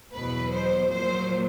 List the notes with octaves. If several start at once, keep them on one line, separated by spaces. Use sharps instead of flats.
E2 B2 F#3 B4
C5
A#2 F#3 C5